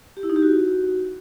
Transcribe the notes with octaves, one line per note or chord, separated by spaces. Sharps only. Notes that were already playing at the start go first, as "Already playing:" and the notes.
G4
E4
D#4
G4
F#4